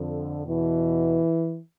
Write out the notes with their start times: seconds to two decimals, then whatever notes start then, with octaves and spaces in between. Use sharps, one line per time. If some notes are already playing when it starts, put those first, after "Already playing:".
Already playing: F2 D3
0.46 E2 B2 E3